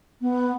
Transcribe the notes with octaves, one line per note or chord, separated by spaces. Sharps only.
B3